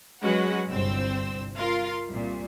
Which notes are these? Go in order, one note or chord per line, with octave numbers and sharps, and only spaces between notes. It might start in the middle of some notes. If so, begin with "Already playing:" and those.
F#3 G#3 C#4 F#4 B4 F#5
G1 C2 C4 C5 E6
F4 A#4 F5 C6
C2 A#2